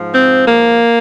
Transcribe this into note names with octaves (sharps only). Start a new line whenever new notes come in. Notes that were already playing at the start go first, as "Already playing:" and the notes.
Already playing: G#2 F3
C4
A#3